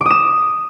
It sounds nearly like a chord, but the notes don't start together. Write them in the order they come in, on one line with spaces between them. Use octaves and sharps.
D6 D#6 E7